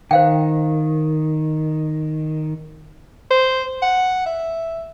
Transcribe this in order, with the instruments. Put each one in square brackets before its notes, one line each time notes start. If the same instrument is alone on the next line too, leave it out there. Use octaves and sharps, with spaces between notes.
[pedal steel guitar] D#3 [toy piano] C5 F5 G5
[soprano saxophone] C5
F#5
E5